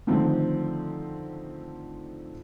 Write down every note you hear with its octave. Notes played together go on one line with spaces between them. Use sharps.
D3 D#3 F3 A3 C4